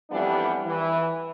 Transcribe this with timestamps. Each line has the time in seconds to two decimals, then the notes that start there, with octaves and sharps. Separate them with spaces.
0.11 F2 E3 G3 B3 D4 G4
0.66 E3